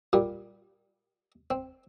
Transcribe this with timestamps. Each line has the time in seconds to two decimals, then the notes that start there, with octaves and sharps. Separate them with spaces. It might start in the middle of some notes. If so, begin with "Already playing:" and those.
0.13 A#2 G3
1.51 C4